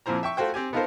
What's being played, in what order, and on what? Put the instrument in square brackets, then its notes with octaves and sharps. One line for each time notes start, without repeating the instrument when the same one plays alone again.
[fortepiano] F2 A#2 F3 E4 C5 A#5
E5 G5 C#6
A3 F4 F#4 C5 G5
C4 G4 G#5
B3 D#4 F4 A4 A#4 C5